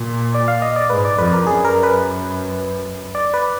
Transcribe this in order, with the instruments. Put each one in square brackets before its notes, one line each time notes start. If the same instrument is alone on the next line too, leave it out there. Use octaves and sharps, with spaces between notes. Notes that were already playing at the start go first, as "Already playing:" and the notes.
Already playing: [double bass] A#2
[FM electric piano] D5
F5
D#5
D5
[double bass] G#2 [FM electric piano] B4
[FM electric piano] D5
[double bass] F2 [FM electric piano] B4
[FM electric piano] A#4
[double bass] F#2 [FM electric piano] G#4
[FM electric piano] A#4
B4
D5
B4